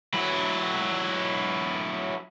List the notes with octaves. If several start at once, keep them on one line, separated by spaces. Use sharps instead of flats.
F#3 E4